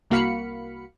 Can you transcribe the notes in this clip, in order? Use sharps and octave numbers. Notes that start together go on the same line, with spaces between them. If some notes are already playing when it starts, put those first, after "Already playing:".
C2 A#3 F#4 F5 B5 C#7